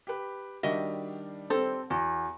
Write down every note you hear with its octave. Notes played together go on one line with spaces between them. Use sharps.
G4 B4
D#3 G3 D4 F#4 D#5 E5
C4 G4 A4 C5
E2 F#4